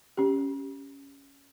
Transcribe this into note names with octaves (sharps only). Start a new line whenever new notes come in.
C#4 G4